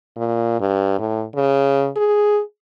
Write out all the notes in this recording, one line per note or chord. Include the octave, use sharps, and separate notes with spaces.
A#2
G2
A2
C#3
G#4